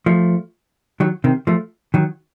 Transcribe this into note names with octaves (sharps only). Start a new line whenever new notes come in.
F3 A3
D#3 F#3
C3 D#3
F3 A3
D#3 F#3